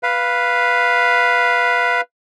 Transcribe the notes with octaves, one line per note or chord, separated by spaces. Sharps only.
B4 F5